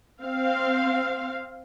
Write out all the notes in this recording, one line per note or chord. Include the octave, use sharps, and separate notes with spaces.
C4 F5